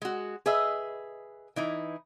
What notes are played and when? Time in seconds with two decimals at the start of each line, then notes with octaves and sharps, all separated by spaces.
0.02 G#3 F#4
0.46 G#4 B4 D#5 E5
1.56 E3 D#4 E4